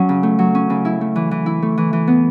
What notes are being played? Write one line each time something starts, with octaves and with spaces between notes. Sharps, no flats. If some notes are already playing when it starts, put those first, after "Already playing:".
Already playing: F#3 C#4
C#3
A3
F#3
C#4
C#3
E4
A3
E3
E3
E4
A3
E3
E3
B3